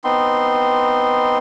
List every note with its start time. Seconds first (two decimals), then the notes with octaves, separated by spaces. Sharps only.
0.04 B3 C4 D#4 C6